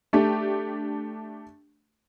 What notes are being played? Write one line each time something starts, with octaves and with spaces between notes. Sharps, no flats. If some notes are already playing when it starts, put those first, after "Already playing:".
A3 D4 G4